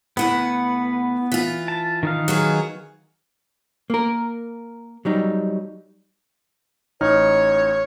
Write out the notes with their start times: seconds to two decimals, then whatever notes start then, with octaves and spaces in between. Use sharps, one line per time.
0.17 D2 B3 E4 B4 F#5
1.32 E3 F4
1.68 A5
2.03 D#3 D#4 F5
2.28 F#3 B3 G#4
3.90 A#3 A#4
5.05 F#3 G3 D#4
7.01 A1 D#4 C#5 F6